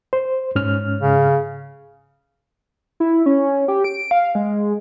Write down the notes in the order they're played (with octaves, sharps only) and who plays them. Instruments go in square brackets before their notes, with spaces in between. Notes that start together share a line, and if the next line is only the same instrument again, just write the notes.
[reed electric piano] C5
G#2 C#4 F6
[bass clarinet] C#3
[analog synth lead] E4
C#4
G4
D7
F5
G#3